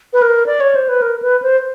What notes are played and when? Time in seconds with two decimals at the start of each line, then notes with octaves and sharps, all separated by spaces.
0.13 B4
0.22 A#4
0.46 D5
0.60 C#5
0.75 C5
0.89 B4
1.02 A#4
1.22 B4
1.42 C5